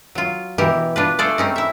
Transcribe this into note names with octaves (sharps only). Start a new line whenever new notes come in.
F#3 F4
B2 E3 G4 A#4
D4 F4 B4
A3 G#4 A4 C5 D5 F5
C4 C#4 D#4
E4 E5